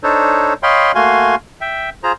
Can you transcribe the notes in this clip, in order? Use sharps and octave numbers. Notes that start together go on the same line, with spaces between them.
D4 D#4 A4 C5 C#5
C#5 D#5 F5 G5 B5 C6
A3 A#3 F#4 F5 G#5 C6
E5 G5
F4 G#4 C5 A#5